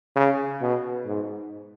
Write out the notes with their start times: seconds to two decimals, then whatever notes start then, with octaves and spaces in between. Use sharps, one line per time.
0.16 C#3
0.61 B2
1.06 G#2